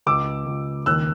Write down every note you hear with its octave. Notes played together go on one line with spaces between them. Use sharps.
C#2 D6 E6
C#2
D#2 E6 F#6